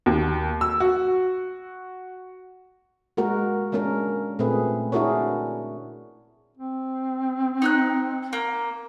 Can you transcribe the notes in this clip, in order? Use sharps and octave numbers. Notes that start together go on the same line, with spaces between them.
D#2
E6
F#4
G#3 A#3 F#4 A#4
G#3 A#3 C#4 D4 A#4
A#2 A3 C4 G#4 B4
D4 E4 F#4 G#4 A#4 C#5
C4
D#4 E6 F#6
A#3